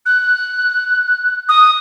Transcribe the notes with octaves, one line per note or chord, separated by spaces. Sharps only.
F#6
D#6